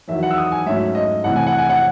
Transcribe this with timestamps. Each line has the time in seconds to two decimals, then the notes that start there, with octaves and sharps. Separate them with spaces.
0.08 E2 D#3 F#3 E5
0.23 F#5
0.31 E6
0.38 D#6
0.52 G#5
0.66 G#2 F#3 A3 C#4 E5
0.95 D#5
1.24 C2 C3 E3 A3 F#5
1.36 G#5
1.47 F#5
1.59 G#5
1.69 F#5